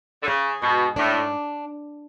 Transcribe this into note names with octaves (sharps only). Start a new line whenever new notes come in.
D3
C#3 G#4
G#2 B2
A2 D4